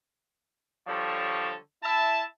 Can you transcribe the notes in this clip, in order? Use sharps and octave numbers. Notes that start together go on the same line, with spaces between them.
D3 F3 G3 A4 C#5
E4 E5 A5